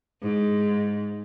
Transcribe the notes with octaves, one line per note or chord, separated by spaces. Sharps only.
G#2